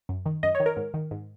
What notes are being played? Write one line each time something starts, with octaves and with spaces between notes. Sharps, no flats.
F#2
D#3
F#2 D#5
C#5
D#3
A#4
G#2
D#3
G#2